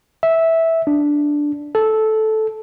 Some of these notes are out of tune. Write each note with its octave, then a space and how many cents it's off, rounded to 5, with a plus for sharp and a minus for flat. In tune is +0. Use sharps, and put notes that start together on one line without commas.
E5 -10
D4 +0
A4 -10